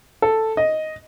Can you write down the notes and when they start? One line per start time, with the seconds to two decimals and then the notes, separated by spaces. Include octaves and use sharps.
0.22 A4
0.57 D#5